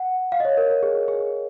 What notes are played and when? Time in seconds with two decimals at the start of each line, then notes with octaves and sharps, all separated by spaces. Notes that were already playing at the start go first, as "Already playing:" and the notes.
Already playing: F#5
0.32 F5
0.40 D#5
0.45 C#5
0.57 A#4
0.70 A#4
0.83 G#4
1.08 G#4